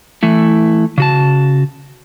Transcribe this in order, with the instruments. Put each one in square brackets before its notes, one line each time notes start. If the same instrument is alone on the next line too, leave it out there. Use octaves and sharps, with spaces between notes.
[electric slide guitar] E3 A3 E4
C#3 F#4 A5